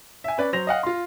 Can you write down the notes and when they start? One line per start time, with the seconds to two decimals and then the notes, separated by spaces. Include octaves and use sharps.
0.24 E5 G#5
0.38 C#4 B4 D5
0.53 F#3 C5 A#6 F7
0.67 D#5 F5 F#5
0.83 F4 C6